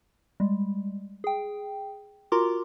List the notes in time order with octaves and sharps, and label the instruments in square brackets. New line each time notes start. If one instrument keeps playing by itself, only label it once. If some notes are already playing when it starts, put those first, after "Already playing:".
[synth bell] G3 G#3
G#4 G5
F4 F#4 A#4 A#5 C6 D6